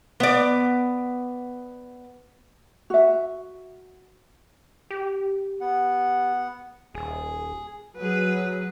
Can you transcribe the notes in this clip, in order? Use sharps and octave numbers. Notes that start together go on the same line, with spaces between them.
B3 D5
F#4 E5
G4
B3 F#5
D#1 G#4
F#3 G#4 B4